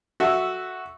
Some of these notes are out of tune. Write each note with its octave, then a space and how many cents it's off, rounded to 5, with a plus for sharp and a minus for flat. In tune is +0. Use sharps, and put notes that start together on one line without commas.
F#4 +0 A4 +0 E5 -5